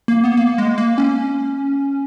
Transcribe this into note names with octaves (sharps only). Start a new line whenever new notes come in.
A#3
B3
A#3
G#3
A#3
C#4